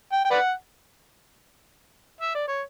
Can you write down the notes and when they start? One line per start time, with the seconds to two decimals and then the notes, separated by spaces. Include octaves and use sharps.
0.12 G5
0.25 G5
0.31 B4 D5 F#5
2.21 E5
2.35 D5
2.48 C#5